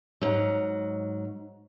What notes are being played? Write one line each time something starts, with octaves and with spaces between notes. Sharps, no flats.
G#2 F#3